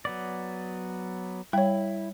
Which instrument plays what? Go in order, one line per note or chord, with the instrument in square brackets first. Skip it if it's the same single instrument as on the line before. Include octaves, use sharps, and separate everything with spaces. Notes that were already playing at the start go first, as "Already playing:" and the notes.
[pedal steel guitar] F#3 B3 D5
[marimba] G3 [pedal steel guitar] E4 [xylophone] C#5 G5